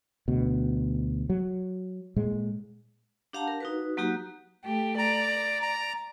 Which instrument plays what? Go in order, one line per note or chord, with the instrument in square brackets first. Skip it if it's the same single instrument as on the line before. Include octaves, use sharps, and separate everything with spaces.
[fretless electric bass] D2 B2
F#3
A#2 G#3
[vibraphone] D4 G4 F5 F#5 A5 A#5
A#4
D#4 F#4 B4
F#3 A#3 D#4 F#4 G4
[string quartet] A3 G4
[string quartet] D5 [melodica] A#5
[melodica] A#5